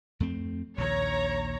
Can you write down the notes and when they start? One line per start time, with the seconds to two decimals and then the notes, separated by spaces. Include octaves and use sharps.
0.20 F2 A3 C4
0.78 A#1 D#2 C#5 A#5